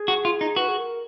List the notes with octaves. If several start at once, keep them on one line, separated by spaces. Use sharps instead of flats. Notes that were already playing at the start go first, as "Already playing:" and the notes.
Already playing: G#4
F#4
F4
D#4
F#4 B4
G#4
A#4